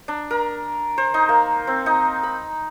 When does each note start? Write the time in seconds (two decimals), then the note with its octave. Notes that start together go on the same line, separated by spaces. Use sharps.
0.08 D4
0.31 A#4
0.98 C5
1.14 D#4
1.29 A#3
1.67 C4
1.86 D#4
2.23 B5